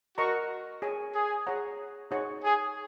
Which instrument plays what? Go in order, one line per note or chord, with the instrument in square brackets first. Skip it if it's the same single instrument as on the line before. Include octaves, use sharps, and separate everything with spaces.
[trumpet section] F#4 [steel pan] A#4 D#5 A#5 C#6
[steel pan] G#4 C#5 G#5
[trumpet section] G#4
[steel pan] G#4 C#5 F#5 A#5
D#4 G#4 C#5 F#5 C#6
[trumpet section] G#4